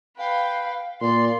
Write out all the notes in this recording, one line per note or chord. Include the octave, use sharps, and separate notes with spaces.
B4 F5 G5
A#2 D5 C6